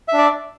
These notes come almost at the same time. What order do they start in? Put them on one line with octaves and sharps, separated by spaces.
E5 D4 D5